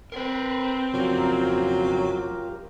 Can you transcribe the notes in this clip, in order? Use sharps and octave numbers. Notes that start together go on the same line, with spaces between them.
C4 A#4 B4
F2 C#3 F#3 F4 G4 A#4